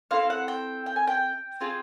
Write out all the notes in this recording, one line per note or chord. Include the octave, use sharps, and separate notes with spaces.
C4 E4 A4 F5
F#5
G5
G5
G#5
G5
C4 F4 G#4